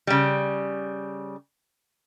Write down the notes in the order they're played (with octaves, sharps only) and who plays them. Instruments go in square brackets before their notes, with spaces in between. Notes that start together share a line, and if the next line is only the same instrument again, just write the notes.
[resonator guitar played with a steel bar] C#3 G3